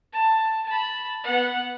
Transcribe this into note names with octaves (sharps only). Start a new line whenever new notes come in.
A5
A5 B5
B3 F#5